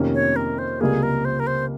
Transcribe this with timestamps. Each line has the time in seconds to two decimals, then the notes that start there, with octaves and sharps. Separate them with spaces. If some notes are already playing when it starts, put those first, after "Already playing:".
Already playing: F2 C3 D#3 A#3 C#4
0.14 C#5
0.36 A#4
0.59 C5
0.81 C#2 C3 G3 A#3 G#4
1.03 A#4
1.25 C5
1.40 A#4
1.47 C5